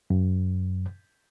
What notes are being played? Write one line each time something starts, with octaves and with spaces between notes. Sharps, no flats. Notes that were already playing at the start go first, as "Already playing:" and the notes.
F#2